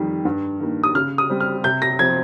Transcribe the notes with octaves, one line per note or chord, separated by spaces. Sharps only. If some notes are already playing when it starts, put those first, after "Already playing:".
Already playing: F2 D#3 G3
G2
D#3 A#3
D#6
C#3 F6
D#6
G3 C4
F6
C3 G6
A#6
F3 C4 G#6